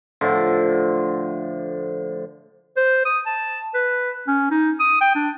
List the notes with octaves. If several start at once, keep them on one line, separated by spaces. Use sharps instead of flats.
A2 D3 F3
C5
D#6
A5
B4
C#4
D#4
D#6
G5
D4